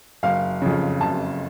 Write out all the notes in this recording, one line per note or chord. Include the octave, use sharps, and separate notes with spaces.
F#1 F5
F2 C#3
F#1 A5